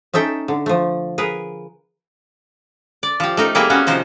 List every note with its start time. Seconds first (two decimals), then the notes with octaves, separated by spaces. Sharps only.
0.14 C#4 D#4 A4 E5 G5
0.48 D3
0.66 F3 A3
1.18 G#4 A#4 B4
3.03 D5
3.20 F3 G4
3.37 A3 D#4 A#4
3.55 G3 A#3 C4 E4 G#4 A#4
3.70 A#3 B3 C#4 F#4
3.87 C3 F3 D#4 C5